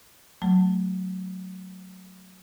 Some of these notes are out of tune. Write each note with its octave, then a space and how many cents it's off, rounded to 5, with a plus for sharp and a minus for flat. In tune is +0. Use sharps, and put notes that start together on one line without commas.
F#3 +0 A3 +0